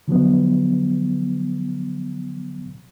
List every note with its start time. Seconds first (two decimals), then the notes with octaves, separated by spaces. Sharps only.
0.08 D3 F3 F#3 B3